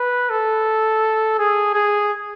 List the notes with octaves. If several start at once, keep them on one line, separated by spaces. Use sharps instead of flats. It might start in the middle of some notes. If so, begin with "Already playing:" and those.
Already playing: B4
A4
G#4
G#4